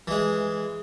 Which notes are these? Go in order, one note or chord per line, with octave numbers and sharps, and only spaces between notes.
E3 G#3